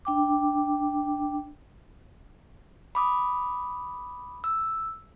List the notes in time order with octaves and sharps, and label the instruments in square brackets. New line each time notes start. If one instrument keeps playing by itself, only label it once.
[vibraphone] D4 G5 D6
[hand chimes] B5 D6 D#6
E6